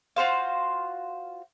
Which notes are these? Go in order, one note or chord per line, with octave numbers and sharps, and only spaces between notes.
F4 F#4 C5 F5